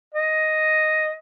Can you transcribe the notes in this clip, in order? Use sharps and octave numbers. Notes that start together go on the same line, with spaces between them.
D#5